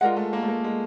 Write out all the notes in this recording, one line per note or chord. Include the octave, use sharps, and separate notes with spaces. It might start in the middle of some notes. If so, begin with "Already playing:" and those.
G#3 F4 A#4 D5 F#5
A3
A#3
A3
A#3
G#3